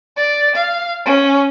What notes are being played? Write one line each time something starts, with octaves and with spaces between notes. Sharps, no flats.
D5
F5
C#4